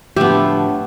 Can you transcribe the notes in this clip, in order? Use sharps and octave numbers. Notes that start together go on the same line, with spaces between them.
A2 D3 F3 A3 B3 G4